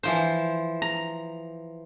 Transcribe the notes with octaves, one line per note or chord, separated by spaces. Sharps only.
E3 F3 C5
A#5